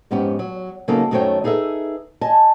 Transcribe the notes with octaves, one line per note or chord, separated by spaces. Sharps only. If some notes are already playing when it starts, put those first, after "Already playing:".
F2 G#2 B3 C#4 G4
F#3
C#3 F#3 A#3 B3 D#4 A4
F#2 D#3 A3 C5 C#5 G5
D#4 G#4 A4 B4 E5
D#5 G#5 A5